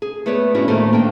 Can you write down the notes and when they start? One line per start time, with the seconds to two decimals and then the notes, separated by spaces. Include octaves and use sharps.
0.02 G#4
0.26 A3 B3 B4 C#5 D5
0.55 A2 B3 C#4 D4 E4 F#4
0.68 D#2 A2 D#3 A3 A#3 C5
0.93 A#3 D4 G5